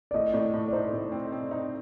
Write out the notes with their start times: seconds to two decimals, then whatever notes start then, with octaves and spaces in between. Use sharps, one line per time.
0.11 D5
0.14 A2 D#5
0.34 A2 D5
0.54 A2
0.68 D5
0.73 D#4 C5
0.93 A2
1.12 C4
1.32 C4
1.51 D#4